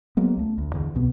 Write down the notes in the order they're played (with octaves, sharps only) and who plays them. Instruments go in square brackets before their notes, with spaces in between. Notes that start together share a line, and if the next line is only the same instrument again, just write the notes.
[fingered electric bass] F#3 G#3 A#3 B3
C#2 A3
D2
E2 D3
C2 B2 B3